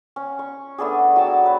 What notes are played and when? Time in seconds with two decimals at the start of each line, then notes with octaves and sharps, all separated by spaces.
0.16 C#4
0.39 C#6
0.78 A3 B3 D4 G#4
1.16 F#3 G5 A5 E6
1.44 B4 C#5